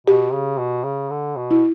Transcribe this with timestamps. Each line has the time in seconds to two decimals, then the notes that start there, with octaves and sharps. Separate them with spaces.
0.07 B2 G4
0.33 C#3
0.58 B2
0.84 C#3
1.10 D3
1.36 B2
1.51 E4